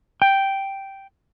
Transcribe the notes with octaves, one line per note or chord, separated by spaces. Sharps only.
G5